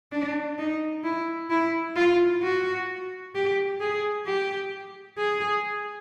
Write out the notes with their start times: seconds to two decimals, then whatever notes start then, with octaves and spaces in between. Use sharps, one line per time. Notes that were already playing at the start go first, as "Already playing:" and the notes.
0.12 D4
0.58 D#4
1.04 E4
1.50 E4
1.97 F4
2.43 F#4
3.35 G4
3.81 G#4
4.27 G4
5.19 G#4